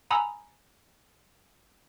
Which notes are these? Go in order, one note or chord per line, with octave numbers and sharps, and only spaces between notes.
F#5 G#5 A#5 B5 D#6 E6